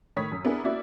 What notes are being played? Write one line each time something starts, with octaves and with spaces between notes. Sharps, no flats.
A2 D#3 C#5 B5 D#6 B6
F#2
B3 D4 E4 G#4 A#4
A#3 C#4 E4 F#4 D5 E5